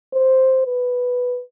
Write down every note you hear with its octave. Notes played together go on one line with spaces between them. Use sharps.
C5
B4